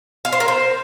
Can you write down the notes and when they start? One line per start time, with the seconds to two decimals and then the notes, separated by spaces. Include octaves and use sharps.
0.25 F5
0.33 C5
0.40 A#4
0.48 C5